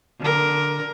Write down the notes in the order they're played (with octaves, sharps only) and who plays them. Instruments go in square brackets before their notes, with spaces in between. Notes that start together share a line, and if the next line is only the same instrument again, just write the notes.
[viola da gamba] D3 A#4